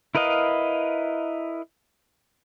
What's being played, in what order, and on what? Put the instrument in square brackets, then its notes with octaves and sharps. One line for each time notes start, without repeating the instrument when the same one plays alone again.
[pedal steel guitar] E4 A#4 B4 D#5 F5